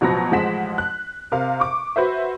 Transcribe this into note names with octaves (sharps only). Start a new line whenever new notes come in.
A1 B2 F3 F#3 B5 A#6
A1 F3 G#3 F#5 B6 E7
F#6
C3 A#4 F5
C#6 D6
F#4 B4 C5 E5